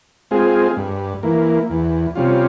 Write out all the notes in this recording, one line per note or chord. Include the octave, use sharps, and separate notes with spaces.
G#3 C4 F4 G#4
G2
E3 A#3
E2
C3 G3 C#4 F4